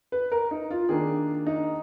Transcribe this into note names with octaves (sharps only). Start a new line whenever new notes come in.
B4
A#4
D#4
F4
D#3 A#3 D4 G#4
D#4